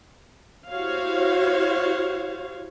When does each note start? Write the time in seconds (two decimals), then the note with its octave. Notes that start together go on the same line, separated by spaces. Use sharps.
0.70 E4 F#4 G4 C5 C#5 F5